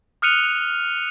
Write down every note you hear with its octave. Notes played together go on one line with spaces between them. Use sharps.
D#6 F6 F#6 C#7 D#7 F7